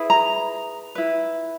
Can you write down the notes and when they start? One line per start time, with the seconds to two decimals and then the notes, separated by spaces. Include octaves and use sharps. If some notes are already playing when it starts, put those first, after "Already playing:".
Already playing: E4 G#4 B4
0.10 A#5
0.95 E4 B4